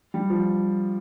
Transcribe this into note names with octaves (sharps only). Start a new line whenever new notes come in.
G3
F3